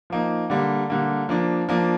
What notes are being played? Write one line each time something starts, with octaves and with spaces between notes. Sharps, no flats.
F3 A#3 D#4
D3 G3 A#3
D3 G3 A#3
F3 A#3 D4
F3 A#3 D4